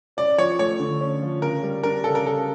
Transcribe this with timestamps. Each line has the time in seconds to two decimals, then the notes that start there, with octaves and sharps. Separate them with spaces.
0.17 C#4 D5
0.38 F3 C#5
0.59 A3 C#5
0.80 D3
1.01 C#4
1.22 F3
1.42 C#3 A#4
1.63 G3
1.83 D4 A#4
2.04 C#3 A4
2.15 A#4
2.26 C#3 A4